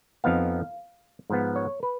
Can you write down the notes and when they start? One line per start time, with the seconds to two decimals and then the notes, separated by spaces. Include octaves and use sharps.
0.24 F2 F3 B3 D#4 F5
1.30 G#2 F3 B3
1.56 C#5
1.83 B4